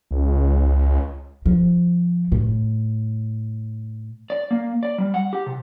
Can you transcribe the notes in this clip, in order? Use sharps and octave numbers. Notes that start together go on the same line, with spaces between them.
C#2
F3
A2
D5
A#3
D5
G3
F#5
G4
C3